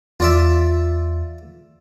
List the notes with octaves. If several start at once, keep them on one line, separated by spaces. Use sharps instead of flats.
E2 F4 D5 E5